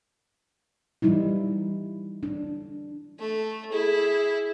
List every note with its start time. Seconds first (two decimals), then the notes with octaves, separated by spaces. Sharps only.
1.02 E3 G3 D#4 E4
2.23 D4
3.19 A3
3.72 E4 G#4